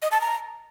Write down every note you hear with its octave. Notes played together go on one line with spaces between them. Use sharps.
D#5
A5
A#5